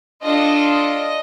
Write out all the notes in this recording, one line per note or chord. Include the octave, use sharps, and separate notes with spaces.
D4 F4 A4 D#5
D#5